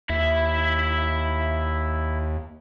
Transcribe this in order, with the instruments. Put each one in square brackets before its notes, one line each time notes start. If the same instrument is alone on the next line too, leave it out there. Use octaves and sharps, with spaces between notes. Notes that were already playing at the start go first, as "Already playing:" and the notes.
[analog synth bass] D#2 [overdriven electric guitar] E4 E5